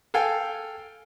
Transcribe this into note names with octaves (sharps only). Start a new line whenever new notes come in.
A4 F5 G5 G#5